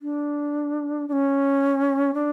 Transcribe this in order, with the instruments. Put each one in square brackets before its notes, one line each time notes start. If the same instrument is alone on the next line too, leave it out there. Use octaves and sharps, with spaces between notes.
[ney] D4
D4
C#4
D4